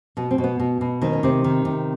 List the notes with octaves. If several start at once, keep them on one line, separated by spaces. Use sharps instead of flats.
B2 B3
C4
B2
B3
B2
B2
D#3 C4
C#4
C3 C4
D#3
C3